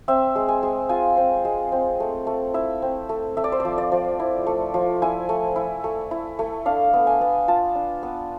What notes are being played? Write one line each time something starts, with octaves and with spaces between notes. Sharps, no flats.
C4 E5
G#3
G#5
G#3
F4 G#5
C4
G#3
C4
A3
A3
E4 E5
C4
A3
A3 E5
D5
C5
D5
F3
D5
F3
E4
A3
F3
E4 G#5
A3
E4
A3
E4
A3
D4 F5
B3
G#5
B3
F4 A5
D4
B3